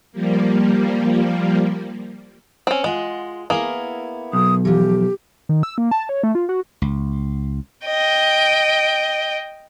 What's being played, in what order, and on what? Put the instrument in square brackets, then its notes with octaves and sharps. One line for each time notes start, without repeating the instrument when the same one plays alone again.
[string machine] F3 G3 A#3
[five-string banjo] C4 C#4
[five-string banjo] G#3 [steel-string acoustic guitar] F4 D#5 F#5
[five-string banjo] A#3 G#4 [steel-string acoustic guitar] B3 E4 A#4
[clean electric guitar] B1 [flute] D#6
[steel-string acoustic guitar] E3 F3 [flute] G4
[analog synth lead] D#3
E6
A#3
A5
C#5
A3
F4
F#4
[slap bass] C#2
[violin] D#5 G5